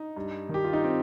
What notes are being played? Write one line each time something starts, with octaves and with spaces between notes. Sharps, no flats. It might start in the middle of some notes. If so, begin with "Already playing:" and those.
Already playing: D#4
G2
D#3 G4
F4
D#4
C4